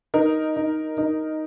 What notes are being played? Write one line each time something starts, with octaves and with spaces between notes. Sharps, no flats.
D#4 A#4
D#4
D#4